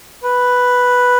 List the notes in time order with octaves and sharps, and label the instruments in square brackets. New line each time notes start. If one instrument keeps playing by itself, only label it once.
[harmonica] B4